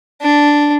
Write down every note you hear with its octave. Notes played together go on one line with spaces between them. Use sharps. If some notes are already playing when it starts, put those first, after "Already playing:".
D4